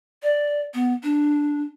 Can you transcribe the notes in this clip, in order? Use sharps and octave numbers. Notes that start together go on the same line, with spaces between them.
D5
B3
D4